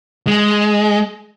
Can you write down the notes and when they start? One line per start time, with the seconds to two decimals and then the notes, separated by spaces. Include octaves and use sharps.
0.27 G#3